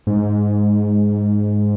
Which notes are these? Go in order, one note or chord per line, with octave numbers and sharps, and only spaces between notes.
G#2